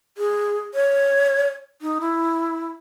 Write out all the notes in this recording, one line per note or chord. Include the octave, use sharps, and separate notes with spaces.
G#4
C#5
D#4
E4